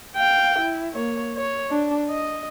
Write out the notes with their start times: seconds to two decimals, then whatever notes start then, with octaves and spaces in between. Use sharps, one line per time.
0.16 F5 G5
0.59 E4
0.94 A#3 C#5
1.37 C#5
1.70 D4
2.10 D#5